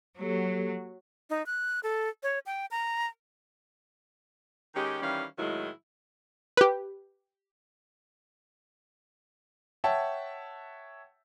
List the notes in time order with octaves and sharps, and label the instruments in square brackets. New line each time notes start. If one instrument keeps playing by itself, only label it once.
[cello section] F#3 [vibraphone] A#3 G4 A4
[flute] D#4
F#6
A4
C#5
G5
A#5
[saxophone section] D#3 G#3 C#4 G4
D#3 E3 G3 C#4 F5
A2 D#3 F#3 G#3 E4
[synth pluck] G4 B4
[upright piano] C#5 E5 F#5 G5 A5